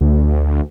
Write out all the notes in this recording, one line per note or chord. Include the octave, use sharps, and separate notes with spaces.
D2